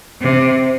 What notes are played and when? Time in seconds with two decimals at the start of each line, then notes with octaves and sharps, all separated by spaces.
0.20 C3